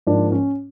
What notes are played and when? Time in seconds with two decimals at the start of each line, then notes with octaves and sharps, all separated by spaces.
0.07 G#2 F3 A#3 D4
0.32 C#4